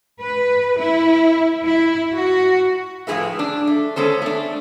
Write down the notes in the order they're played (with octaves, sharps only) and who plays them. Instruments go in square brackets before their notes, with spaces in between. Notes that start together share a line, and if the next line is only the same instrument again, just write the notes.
[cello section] B4
E4
E4
F#4
[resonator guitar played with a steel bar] A2 F3 G3 G#4 B4 E5
D4
A3
G#3 B3 C#4 A4 C5
A3 D4